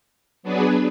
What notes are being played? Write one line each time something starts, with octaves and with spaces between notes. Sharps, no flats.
F#3 B3 D4 G#4 B4